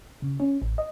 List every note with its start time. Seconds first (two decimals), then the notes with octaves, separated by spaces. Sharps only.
0.22 C#3
0.40 C#4
0.62 A1
0.78 D#5